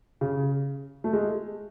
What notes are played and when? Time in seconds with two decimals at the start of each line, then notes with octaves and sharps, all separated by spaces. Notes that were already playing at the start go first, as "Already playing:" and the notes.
0.21 C#3
1.04 A3
1.13 G#3